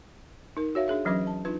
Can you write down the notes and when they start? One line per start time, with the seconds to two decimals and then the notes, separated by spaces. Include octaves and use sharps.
0.57 D#4 A#4
0.75 F#4 C#5 E5 F5
0.88 D4 G#4 E5
1.05 E3 F#3 C#4 B4 D6
1.27 A5
1.45 D4 D#4 F4 B4